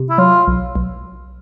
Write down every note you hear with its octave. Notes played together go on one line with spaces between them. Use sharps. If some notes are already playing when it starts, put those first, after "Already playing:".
Already playing: C3
E4
F#3 F4
B1
B1